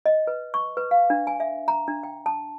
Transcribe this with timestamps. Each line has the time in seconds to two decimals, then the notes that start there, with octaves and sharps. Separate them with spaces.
0.06 D#5
0.27 B4
0.54 C#6
0.77 B4
0.91 F5
1.10 D4
1.27 G#5
1.40 E5
1.68 A#5
1.88 D4
2.03 G5
2.26 A5